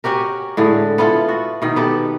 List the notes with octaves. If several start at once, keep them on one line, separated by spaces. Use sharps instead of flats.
C#4 F#4 G4 A#4
A2 D3 G#3
B3 E4 F4 A4
F#4
B2 D#3
B3 G4 A4